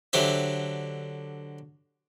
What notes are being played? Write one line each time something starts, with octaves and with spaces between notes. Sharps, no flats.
D3 F#3 G4 C5 E5